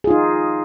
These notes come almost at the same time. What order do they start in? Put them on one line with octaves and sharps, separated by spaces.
G#4 F4 D#4